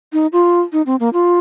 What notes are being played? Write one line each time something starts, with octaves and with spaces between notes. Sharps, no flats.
D#4
F4
D#4
C4
A#3
F4